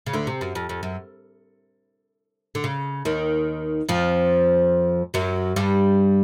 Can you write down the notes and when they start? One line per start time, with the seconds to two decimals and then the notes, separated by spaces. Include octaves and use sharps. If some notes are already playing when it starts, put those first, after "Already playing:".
0.06 C#3
0.13 D2 D3
0.27 C3
0.41 F#2
0.55 F2
0.69 F2
0.83 F#2
2.55 D3
2.64 C#3
3.05 D#2 D#3
3.89 F2 F3
5.14 F#2 F#3
5.56 G2 G3